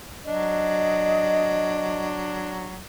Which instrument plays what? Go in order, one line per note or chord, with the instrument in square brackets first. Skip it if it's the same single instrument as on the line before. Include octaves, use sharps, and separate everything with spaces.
[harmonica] F#3 D4 [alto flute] D#5